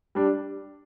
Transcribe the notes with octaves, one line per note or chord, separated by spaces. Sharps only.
G3 D4